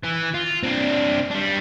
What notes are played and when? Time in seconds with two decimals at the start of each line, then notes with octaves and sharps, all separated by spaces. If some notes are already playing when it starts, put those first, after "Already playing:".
0.03 E3
0.34 F4
0.63 C4 D4
1.31 G3 D4